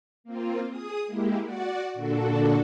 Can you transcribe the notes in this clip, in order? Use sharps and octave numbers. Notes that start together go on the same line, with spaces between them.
A#3 C4 F4
G#4 D#6
G#3 A#3 E4 G4
F#4 D5 F#5
A#2 D3 D4 F#4 A4